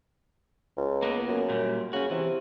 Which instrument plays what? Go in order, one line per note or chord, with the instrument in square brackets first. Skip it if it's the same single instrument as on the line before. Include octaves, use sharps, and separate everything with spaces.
[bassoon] C#2
[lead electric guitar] A#3 B3
[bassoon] F#2
[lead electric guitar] A#2 G3
[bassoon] C#3 [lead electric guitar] C#4 F#4
[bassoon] C3 [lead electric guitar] E3